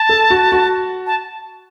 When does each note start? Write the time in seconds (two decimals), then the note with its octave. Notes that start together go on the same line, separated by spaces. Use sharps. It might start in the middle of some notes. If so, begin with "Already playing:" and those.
Already playing: A5
0.09 A4
0.30 F#4
0.52 F#4
1.07 A5